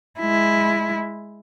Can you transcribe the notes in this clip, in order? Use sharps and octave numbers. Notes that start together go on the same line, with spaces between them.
G#3 E4